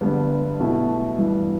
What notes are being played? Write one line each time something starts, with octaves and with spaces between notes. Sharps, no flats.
G1 G2 D3 G3 B3
B1 B2 A3 E4
G2 E3 G3